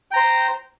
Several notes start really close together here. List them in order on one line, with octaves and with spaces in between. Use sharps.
G5 A#5 C5